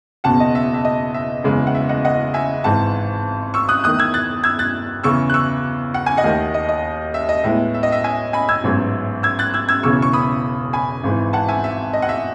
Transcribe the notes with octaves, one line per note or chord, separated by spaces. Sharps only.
F#1 E2 B2 F#5 A5
D#5
E5
E5
D#5
E5
F#1 E2 C#3 E3 G#3
F#5
E5
D#5 F#5
D#5 F#5
E5 G#5
G#1 G#2 E3 F#5 A5
C#6 E6
D#6 F#6
E2 D#3 A3 D#6 F#6
E6 G#6
F#6 A6
E6 G#6
F#6 A6
E2 C#3 E3 C#6 E6
F#6
C#6 E6
F#5
G#5
D#5 F#5
D#2 D#3 A3
D#5
D#5
E5
D#5
A2 G#3 B3 E4 E5
E5
D#5
E5
E5 G#5
G#5 B5
E6 G#6
A1 G#2 F#3 B3
E6 G#6
F#6 A6
E6 G#6
E6 G#6
E1 E2 C#3 E3 C#6 E6
C#6
B5 D#6
G#5 B5
G#1 G#2 E3
F#5 A5
E5 G#5
E5
D#5
F#5
E5